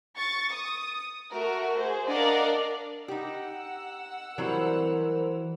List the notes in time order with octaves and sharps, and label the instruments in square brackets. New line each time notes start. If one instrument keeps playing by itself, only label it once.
[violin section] C#6 A6
D#6
A3 F#4 A#4
G#4 C5
D4 A#4 D5 D#5 F5 F#5
[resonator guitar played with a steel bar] D#4 G4 [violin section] F#5 E6
[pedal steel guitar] E3 [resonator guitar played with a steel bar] F#3 G3 C4 [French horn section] A#4 C5